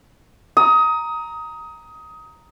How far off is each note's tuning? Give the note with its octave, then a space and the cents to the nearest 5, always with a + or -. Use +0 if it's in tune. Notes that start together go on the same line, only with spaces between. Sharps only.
A#5 +0 D#6 +20